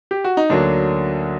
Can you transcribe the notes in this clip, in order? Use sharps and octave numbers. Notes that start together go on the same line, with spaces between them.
G4
F#4
D#4
D2 D3 F#3 A#3 D4